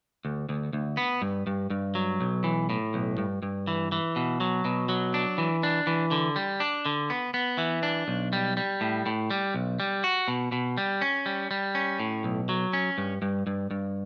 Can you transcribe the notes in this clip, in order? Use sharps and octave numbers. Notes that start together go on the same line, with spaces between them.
D2
D2
D2
B3
G2
G2
G2
F#3
B1
E3
A2
B1
G2
G2
E3
E3
B2
F#3
B2
F#3
D4
E3
D4
E3
D3
G3
D4
D3
B3
B3
E3
D4
B1
G3
G3
A2
A2
G3
B1
G3
F#4
B2
B2
G3
C#4
G3
G3
C#4
A2
B1
F#3
C#4
G2
G2
G2
G2